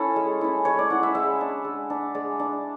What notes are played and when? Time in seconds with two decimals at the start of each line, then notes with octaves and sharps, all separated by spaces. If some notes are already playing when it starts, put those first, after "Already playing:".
Already playing: C#4 E4 A4 C#5
0.16 G#3
0.41 C#4 E4
0.65 G#3 C#5
0.79 D5
0.90 C#4 E4 F#5
1.03 E5
1.15 G#3 E5
1.41 D4
1.64 G#3
1.90 D4
2.15 G#3 D5
2.40 D4